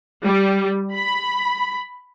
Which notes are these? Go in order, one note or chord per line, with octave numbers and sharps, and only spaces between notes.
G3
B5